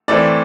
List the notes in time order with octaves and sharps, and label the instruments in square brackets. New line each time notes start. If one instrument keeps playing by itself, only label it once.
[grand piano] A2 E3 A3 C4 D5